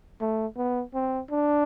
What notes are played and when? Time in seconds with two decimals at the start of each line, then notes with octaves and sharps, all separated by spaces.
0.21 A3
0.57 B3
0.94 C4
1.31 D4